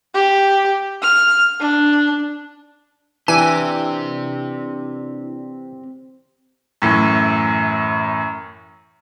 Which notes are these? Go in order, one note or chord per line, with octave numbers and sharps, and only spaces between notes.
G4
F6
D4
E3 C4 D4 E4 G4 D5 G#5
F#2 A2 E3